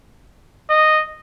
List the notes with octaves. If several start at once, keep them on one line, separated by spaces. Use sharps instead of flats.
D#5